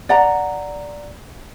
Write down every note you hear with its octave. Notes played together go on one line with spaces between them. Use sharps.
D5 F#5 A#5